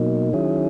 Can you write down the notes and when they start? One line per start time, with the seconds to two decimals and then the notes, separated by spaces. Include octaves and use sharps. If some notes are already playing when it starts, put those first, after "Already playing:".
Already playing: B2 F#3 A#3 D#4
0.33 D#3 F#3 C#4 E4 G#4